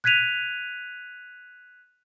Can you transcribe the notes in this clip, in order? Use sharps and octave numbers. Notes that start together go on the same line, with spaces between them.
F#6 G#6 B6 D#7 F7